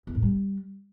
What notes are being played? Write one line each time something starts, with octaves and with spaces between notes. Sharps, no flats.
E2
A2
G3